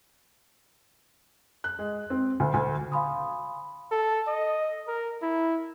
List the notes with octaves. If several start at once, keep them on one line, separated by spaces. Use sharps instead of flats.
F#6
G#3
C4
D2
D2
F5 G#5 B5 C6 D#6
A4
D#5
A#4
E4